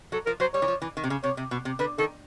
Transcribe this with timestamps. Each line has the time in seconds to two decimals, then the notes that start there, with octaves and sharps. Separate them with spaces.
0.12 F#3 A4
0.26 F3 A#4
0.40 F#3 C5
0.54 G3 C#5
0.62 E3
0.68 F3
0.82 E3
0.97 D#3
1.04 C3
1.10 C#3
1.23 C3 C#5
1.37 C3
1.51 B2
1.65 C3
1.79 D3 B4
1.98 D#3 A4